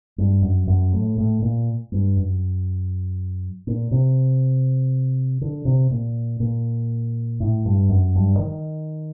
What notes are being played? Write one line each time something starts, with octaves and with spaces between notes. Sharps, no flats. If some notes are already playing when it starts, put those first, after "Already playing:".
G2
F#2
F#2
A2
A2
A#2
G2
F#2
A#2
C3
D3
C3
A#2
A#2
A2
G2
F#2
G2
D#3